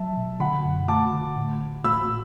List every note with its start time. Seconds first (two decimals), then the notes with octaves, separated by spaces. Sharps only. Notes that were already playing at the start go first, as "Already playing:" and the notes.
Already playing: F#3 E5 A5
0.17 B2
0.40 D3 F#5 B5
0.65 F#2
0.88 A3 A5 D6
1.13 D3
1.36 A2
1.61 A1
1.84 A2 B5 E6